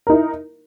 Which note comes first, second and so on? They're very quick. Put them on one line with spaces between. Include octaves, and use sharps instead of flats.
A#4 D#4 E4